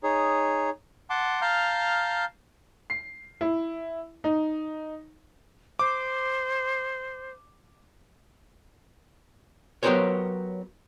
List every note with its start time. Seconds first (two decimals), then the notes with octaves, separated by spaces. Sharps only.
0.03 D#4 G#4 C#5
1.10 F#5 A5 C6 D6
1.41 F5 A5 A#5 F6 G6
2.90 C7
3.41 E4
4.24 D#4
5.79 C5 D6
9.83 F#3 B3 G4 A#4 C5 C#5